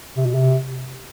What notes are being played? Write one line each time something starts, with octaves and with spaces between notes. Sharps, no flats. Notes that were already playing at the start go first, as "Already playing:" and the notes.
C3
B2
C3